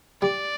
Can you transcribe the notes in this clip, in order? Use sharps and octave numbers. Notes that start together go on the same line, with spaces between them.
G3 D5